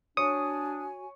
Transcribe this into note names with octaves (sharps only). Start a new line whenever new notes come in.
D4 F#4 C#5 G#5 D#6 C#7